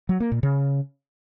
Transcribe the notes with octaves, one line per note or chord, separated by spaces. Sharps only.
F#3
A#3
A#2
C#3